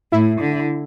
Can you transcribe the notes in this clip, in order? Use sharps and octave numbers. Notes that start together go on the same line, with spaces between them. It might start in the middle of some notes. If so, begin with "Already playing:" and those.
A2 E4
D3